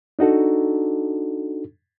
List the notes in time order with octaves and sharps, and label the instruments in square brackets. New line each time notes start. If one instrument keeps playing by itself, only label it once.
[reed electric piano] D4 D#4 F#4 A4